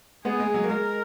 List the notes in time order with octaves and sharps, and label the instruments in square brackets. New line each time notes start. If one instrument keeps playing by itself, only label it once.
[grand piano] G#3 B3 [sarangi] G#4
[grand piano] G#3
F#3
A#3
[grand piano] G#3 [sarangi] A#4